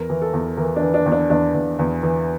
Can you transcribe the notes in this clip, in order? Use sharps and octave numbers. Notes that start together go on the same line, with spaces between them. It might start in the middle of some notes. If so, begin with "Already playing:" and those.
Already playing: E2 A#4
E3
A4
E2
E3 A#4
D4
E3
D4
E2
D4
E2 D4
E2
E2
E3